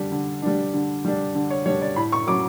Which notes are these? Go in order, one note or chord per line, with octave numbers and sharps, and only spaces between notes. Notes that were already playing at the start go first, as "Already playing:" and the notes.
Already playing: D3 G3 D4
D3
G3 D4
D3
G3 D4
D3
C#5
G3 D4 C#5
D5
A2 B5
C#6
F#3 C#4 D6